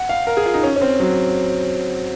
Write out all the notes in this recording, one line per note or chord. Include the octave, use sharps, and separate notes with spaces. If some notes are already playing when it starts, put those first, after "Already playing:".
Already playing: F#5
F5
A#4
G#4
F4
D#4
C#4
C#4
C4
F#3